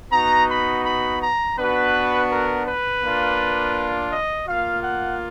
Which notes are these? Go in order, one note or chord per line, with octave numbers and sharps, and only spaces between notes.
B3 D#4 F#4 A#5
B5
B5
A#5
B3 D4 F#4 B4
A#4
B4
A#3 D4 F4
D#5
A#3 F4 F5
F#5